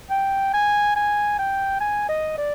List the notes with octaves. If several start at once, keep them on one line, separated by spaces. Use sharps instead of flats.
G5
G#5
G#5
G5
G#5
D#5
D5